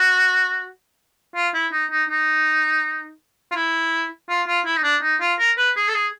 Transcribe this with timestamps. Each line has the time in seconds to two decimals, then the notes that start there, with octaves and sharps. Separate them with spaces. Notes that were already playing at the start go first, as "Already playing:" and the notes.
Already playing: F#4
1.35 F4
1.54 E4
1.72 D#4
1.91 D#4
2.09 D#4
3.52 F4
3.55 E4
4.29 F4
4.47 F4
4.66 E4
4.77 D#4
4.83 D4
5.02 D#4
5.21 F4
5.39 A#4
5.58 B4
5.76 G#4
5.88 A4
5.94 G#4